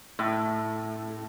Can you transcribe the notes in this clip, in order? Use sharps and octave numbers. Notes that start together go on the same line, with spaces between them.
A2